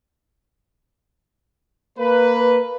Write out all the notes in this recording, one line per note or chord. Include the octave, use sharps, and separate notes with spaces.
A#3 B4